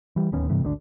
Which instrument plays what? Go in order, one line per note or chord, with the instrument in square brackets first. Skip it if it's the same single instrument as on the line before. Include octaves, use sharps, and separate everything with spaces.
[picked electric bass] E3 G3
D1 D#2 B3 C#4
G2 C3 E3 A3
G#1 D2 F3 D4